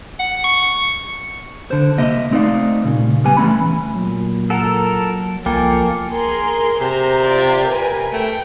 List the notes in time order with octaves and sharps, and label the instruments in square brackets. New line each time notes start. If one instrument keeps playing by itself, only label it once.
[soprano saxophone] F#5
C#6
[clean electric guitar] D3 C5
C2 C3 A#3 D#5 E5
A3 C4 D#4 B4 D5 F5
C2 A#2 C#3
G3 B3 G#5
E3 A3 C#4 B5
[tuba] A#2 [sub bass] F#3
[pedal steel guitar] A4 A#4 [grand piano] F#5
[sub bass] C2 [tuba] F3 [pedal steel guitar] A#3 A4 [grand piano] G5 G#5
[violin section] G#4 A#4 C6
[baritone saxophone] C3 [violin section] C5 A#5
[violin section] F4 D5
A#4 B4 G#5
[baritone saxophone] A3 [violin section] G5